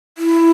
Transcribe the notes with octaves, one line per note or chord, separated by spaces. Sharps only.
E4